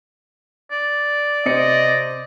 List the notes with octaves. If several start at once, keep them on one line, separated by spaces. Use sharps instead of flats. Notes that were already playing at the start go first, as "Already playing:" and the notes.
D5
C3 C4 D#5 C#7